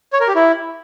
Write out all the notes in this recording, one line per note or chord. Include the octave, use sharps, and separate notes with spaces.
C#5
A#4
G4
E4